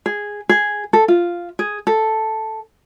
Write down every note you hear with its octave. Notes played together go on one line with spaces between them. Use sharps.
G#4
G#4
A4
F4
G#4
A4